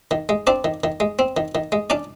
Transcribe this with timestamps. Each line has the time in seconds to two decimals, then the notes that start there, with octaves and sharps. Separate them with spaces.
0.11 D#3
0.29 G#3
0.47 C4 D4 D5
0.64 D#3
0.84 D#3
1.00 G#3
1.19 C4
1.37 D#3
1.55 D#3
1.72 G#3
1.90 C#4 D4 D5